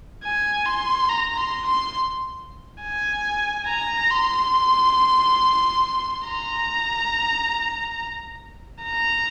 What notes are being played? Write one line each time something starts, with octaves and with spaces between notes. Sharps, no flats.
G#5
C6
A#5
C6
C6
G#5
A#5
C6
A#5
A#5